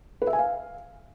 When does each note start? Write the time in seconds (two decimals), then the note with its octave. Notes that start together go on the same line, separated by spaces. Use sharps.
0.22 B4
0.27 E5
0.33 G#5
0.39 F5